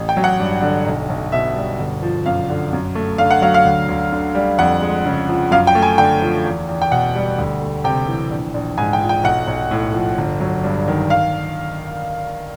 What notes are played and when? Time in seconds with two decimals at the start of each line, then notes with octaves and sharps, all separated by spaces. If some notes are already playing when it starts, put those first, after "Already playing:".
Already playing: A1
0.09 G5
0.17 F#3
0.24 F#5
0.40 G2
0.62 D3
0.87 B1
1.09 B1
1.32 B2 E5
1.56 G3
1.79 G1
2.02 F3
2.26 F#2 F5
2.50 D3
2.73 F#2
2.95 A3
3.18 D3 F5
3.31 F#5
3.42 F#3 F5
3.54 F5
3.65 D2
3.89 D2
4.12 D3
4.35 G3
4.59 F2 F#5
4.82 G#3
5.06 C#3
5.29 F3
5.51 F#2 F5
5.67 G5
5.75 A3
5.82 G#5
5.98 D3 G5
6.22 F3
6.44 E2
6.68 E2
6.82 G5
6.91 B2 F#5
7.15 G3
7.38 D2
7.61 A3
7.84 C3 G5
8.08 E3
8.31 A#1
8.54 A#1
8.77 G#2 G#5
8.93 G5
9.00 F3
9.09 G5
9.24 B1 F#5
9.48 B1
9.71 A2
9.94 F3
10.18 G1
10.40 F#3
10.64 G2
10.88 D#3
11.10 F5